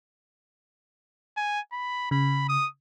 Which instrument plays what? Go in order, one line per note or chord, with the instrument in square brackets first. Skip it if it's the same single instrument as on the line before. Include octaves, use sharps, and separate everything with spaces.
[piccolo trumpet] G#5
B5
[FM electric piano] C#3 [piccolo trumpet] B5
[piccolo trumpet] D#6